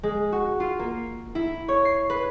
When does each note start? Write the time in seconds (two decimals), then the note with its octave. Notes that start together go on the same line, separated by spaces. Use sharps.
0.03 G#3
0.32 F#4
0.60 F4
0.79 A#3
1.35 E4
1.68 C#5
1.85 C7
2.10 B4